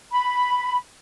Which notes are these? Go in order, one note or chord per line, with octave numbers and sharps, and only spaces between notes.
B5